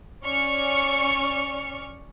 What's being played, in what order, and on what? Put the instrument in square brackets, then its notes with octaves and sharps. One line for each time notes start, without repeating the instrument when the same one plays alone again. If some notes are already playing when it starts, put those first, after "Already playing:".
[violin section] C#4 D5 C#6 F6 C#7